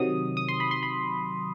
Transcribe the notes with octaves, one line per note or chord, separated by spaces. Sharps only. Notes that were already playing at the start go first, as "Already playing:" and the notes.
Already playing: C3 D#3 F#3 D#6
D#6
C6
B5
C6
B5